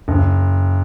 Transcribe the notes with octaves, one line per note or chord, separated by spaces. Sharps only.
F#1